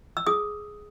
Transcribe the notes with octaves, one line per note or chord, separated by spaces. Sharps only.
E6
G#4 D#6